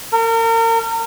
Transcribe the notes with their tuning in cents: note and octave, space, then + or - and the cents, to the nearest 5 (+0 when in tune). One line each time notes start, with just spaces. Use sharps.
A#4 -35